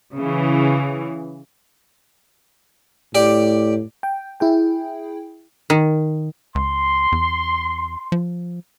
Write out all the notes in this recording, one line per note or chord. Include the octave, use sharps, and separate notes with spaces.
C#3 E3
A2 G4 D5
G5
E4 G#4 G5
D#3
C#2 C6
E2
F3